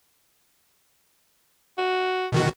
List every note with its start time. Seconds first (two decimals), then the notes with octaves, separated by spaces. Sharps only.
1.78 F#4
2.32 B2 D#3 F#4